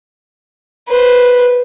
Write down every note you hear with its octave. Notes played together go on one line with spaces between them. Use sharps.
B4 C5